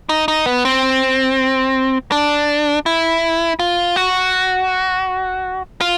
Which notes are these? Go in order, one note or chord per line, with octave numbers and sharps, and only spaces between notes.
D#4
D#4
B3
C4
D4
E4
F4
F#4
F4